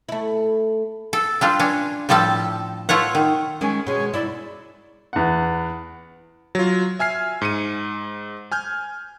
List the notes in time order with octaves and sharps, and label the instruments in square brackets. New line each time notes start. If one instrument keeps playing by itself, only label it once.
[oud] A3 E4
[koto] A4
G3 D4 F4
C#4 D4
A2 F3 G3 A4 A5
A3 F4 C#5 F#5
D#3
[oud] D#3 G#3 [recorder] C#4
[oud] B2 G#3 [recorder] C#5
[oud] D#4 E4 [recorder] D5
[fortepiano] E2 F#5
[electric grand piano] F#3 F4
E5 G#5 F6 C7
G#2 C#7 D#7
G#5 F6 G6